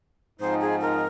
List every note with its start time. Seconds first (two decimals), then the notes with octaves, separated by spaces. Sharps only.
0.40 G#2 F3 C4 D#4 C5
0.61 G#4
0.81 A#4